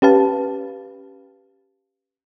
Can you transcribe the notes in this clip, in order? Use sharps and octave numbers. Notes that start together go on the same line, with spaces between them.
C#4 G4 B4 F5 A5